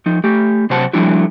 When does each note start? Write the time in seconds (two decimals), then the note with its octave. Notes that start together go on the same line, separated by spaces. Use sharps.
0.06 F3 D#4
0.24 A3 G4
0.70 C3 F#3 C5 F#5 A5
0.93 F3 G3 A3 D4 E4 F#4